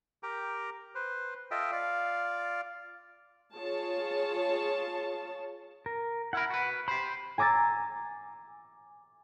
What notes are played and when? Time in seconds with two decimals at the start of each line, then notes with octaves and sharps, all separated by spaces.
0.23 G4 A#4 G5 A#5
0.95 B4 C5
1.51 F4 A4 D#5 E5 G5
1.72 F4 D5 F5
3.55 F4 G#4 C#5 A5
5.86 A#4
6.33 E4 A#4 F#5 B5
6.50 F#4 B4
6.88 G4 C5 B5
7.38 G#5 A#5 D6 E6 A6